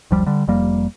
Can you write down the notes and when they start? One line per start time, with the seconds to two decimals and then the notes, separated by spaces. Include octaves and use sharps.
0.11 F#1 D2 F3 G3
0.26 D3 G3
0.48 F1 F2 G3 A#3